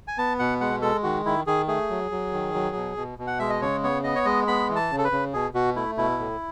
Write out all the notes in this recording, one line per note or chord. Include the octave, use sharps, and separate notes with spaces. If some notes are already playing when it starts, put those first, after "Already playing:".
G#5
B3 A5
B2 F#5
G#3 F#5
G#3 A4
D#3 F#4
D#3 E4
D#3 G#4
A3 G#4
F#3
F#3
D#3
F#3
B2
B2
B2
F#5
G#3 E5
D#5
C#3 C#5
B3 C#5
B3 D#5
C#5
G#3 D#5
B3 B5
E3
A5
C#3
A4
B4
C#3
B2 G#4
B2 F#4
A3 E4
B2 E4
A2